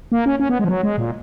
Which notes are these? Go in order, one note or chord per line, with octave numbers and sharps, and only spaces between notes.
A#3
C#4
C#4
B3
G#3
F3
F#3
G#3
A#2